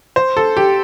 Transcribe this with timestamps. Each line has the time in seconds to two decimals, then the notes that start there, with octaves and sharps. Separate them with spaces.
0.16 C5
0.37 A4
0.57 G4